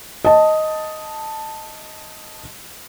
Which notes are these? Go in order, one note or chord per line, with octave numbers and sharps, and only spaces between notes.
D#5 A5